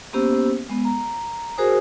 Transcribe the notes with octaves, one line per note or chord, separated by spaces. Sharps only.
A#3 B3 C#4 G4 C5 E6
G#3 B3
A#5
F#4 G#4 A#4 C5 G#5 D#6